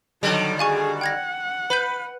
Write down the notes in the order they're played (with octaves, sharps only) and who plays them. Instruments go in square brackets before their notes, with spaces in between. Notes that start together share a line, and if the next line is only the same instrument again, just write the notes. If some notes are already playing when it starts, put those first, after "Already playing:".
[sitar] D3 D#3 G3 [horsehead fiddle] F#3 A4
[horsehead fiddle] F#4 G#4 [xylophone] F5 G#5 C#6
[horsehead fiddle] F#5 [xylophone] G5 G#6 A#6
[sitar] B4 [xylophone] B5 G6